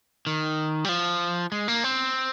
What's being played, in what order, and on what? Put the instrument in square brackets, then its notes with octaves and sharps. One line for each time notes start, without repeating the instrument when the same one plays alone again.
[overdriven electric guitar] D#3
G3
F3
G#3
A#3
C4